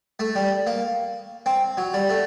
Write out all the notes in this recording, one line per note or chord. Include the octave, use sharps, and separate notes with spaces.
A3
G3
A#3
C4
F#3
G3
A3